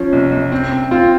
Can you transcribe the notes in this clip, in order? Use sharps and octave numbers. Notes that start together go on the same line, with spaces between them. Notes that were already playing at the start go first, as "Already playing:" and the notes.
Already playing: F3 C#4
C2
C2
C4
C4
C4 F4